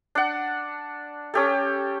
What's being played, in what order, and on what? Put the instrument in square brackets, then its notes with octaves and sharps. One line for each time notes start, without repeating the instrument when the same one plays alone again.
[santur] D4 F#5
C#4 G4 A4